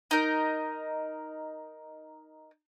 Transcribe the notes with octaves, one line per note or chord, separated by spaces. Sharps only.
D#4 A#4